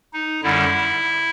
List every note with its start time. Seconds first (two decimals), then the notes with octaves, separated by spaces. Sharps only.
0.13 D#4
0.43 F#2 D3 G3 E4